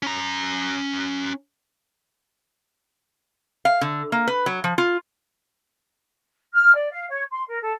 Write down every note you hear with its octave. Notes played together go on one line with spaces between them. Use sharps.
C#4 A#5
F5
D3
A#3
B4
F#3
F3
F4
F6
D5
F5
C#5
C6
A#4
A4